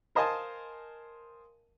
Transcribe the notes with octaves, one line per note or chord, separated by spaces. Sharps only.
A#4 C5 D#5 F5 G#5 A5